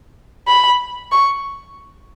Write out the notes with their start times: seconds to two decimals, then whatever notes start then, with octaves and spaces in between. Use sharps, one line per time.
0.48 B5
1.12 C#6